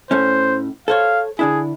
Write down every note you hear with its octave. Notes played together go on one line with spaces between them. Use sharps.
A2 A3 C#4 C5
A4 C5 C#5 F5
D3 D4 E4 G#4